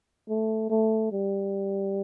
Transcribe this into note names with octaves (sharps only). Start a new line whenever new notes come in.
A3
A3
G3